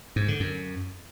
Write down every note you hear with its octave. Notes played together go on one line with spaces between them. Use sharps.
G#2
D3
F#2